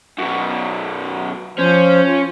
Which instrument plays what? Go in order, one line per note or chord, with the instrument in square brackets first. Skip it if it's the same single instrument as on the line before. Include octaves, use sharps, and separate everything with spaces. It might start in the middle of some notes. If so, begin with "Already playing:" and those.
[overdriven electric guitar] F#2 B2
[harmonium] F3 C5 [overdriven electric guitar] C#4
[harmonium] F4